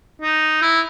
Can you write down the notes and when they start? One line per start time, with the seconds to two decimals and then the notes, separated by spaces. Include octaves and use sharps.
0.21 D#4
0.62 E4